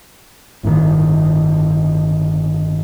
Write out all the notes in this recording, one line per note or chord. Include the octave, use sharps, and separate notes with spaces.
G1 A2 D3 D#3